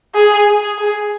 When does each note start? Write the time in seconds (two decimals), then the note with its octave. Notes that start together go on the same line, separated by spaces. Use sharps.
0.15 G#4
0.78 G#4